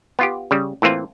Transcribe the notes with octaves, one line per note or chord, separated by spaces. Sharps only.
B3 F4 G4
C#3 G3
A2 E3 A#3 C4 F4